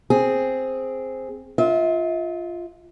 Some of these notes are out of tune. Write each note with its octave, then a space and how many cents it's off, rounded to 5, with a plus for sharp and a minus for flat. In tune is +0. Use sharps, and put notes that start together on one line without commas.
C4 +0 G#4 +0
F4 +0 E5 -45